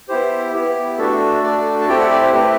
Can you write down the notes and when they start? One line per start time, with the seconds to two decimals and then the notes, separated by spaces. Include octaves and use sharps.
0.09 B3 E4 G4 C5
0.54 B3 E4 G4
0.98 A3 D4 F#4 A4
1.43 A3 D4 F#4 A4 D5
1.81 A5
1.88 A3 C4 E4 G4 G5
2.00 F#5
2.11 D5
2.22 C5
2.33 A3 C4 E4 G4 B4